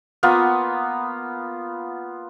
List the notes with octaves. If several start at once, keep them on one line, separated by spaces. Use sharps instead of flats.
A#3 B3 F4